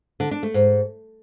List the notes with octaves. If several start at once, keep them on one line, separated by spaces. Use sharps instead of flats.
D3
D4
A3
G#2